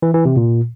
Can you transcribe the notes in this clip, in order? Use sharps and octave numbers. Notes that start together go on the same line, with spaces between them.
E3
E3
C3
A#2